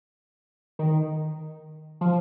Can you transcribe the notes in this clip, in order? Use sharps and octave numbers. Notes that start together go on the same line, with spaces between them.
D#3
F3